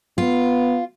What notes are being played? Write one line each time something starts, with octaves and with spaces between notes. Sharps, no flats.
B3 F4